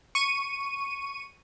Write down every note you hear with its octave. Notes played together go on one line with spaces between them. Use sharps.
C#6 D#7